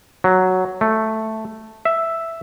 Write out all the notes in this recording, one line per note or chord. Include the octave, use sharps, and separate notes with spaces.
F#3
A3
E5